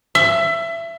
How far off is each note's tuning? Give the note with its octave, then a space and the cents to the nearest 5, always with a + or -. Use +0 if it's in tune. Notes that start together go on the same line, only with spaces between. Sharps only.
E5 +25